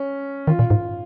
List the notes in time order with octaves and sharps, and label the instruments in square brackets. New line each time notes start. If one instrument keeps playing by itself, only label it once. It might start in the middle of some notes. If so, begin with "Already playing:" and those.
Already playing: [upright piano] C#4
[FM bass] D#3 [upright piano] F4
[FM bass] A#2
G#2